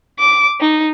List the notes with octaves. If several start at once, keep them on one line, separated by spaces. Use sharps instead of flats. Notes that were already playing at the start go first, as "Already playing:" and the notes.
D6
D#4